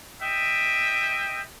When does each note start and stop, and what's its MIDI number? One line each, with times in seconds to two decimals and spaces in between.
0.22 1.41 75
0.22 1.41 76
0.22 1.41 79